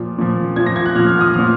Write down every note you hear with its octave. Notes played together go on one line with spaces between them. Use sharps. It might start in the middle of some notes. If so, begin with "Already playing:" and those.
Already playing: A#2 F3
A#2 F3
A#2 F3 G#6
A#6
G#6
F#6
A#2 F3 F6
F6
D#6
A#2 F3 F6